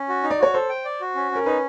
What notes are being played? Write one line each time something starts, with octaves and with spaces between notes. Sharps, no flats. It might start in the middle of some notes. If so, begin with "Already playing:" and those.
Already playing: C#4
F#4
D#4
D5
F#4 C#5
A4 C5
G5
D5
F#4
C#4
C#4 A#4
D#4 B4